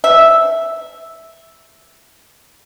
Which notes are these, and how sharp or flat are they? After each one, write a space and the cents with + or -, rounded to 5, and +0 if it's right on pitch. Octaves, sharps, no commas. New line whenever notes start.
E5 -5